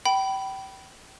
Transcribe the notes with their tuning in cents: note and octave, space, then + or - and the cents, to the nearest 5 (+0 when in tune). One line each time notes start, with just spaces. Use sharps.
G5 -30 B5 +0